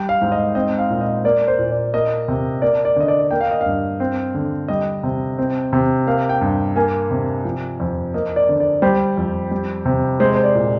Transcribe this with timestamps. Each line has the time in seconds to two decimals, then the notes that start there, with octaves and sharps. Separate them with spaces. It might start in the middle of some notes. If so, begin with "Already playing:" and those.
Already playing: G3 G5
0.09 F5
0.22 G#2
0.32 D#5
0.55 C4 D#5
0.78 F5
0.90 A#2
1.01 D#5
1.24 A#3 D5
1.48 C5
1.59 A#2
1.71 D5
1.93 A#3 D#5
2.28 C3
2.62 A#3 D5
2.85 D5
2.96 D3 D#5
3.08 D5
3.31 A#3 G5
3.41 F5
3.51 D#5
3.61 G2 F5
4.00 C4
4.35 D3
4.68 G3 D#5
5.03 C3
5.38 C4
5.73 C3
6.07 A#3 F5
6.29 G5
6.41 G2
6.76 A#3 G#5
7.11 C3
7.45 F3
7.80 F2
8.14 A#3 D#5
8.36 D5
8.49 D3
8.60 D5
8.82 G3 C5
9.17 F2
9.51 G3
9.86 C3
10.20 G#3 C5
10.35 C5
10.44 D5
10.55 A#2